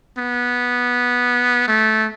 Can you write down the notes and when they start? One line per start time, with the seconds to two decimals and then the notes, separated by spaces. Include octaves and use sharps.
0.18 B3
1.68 A3